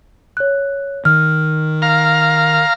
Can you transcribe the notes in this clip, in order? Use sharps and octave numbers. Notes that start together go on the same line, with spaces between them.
C#5 F#6
D#3 F6
F5 A#5